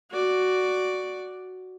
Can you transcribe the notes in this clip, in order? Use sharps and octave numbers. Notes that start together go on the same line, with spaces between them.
F#4 D5